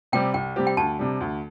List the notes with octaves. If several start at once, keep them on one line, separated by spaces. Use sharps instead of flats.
C3 G3 C4 G4 G5
C2 G5
C3 G3 C4 G4
G5
D2 A5
C3 G3 D4
D2